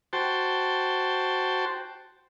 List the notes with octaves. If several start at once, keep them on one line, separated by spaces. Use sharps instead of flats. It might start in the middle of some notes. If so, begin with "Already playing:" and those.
F#4 C5 G5 A5